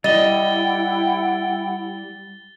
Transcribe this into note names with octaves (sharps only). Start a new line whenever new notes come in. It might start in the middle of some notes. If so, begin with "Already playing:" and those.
G3 E4 D#5 F#5 G5 A6 G7